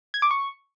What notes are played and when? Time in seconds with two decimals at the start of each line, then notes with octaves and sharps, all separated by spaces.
0.14 G#6
0.22 D6
0.31 C#6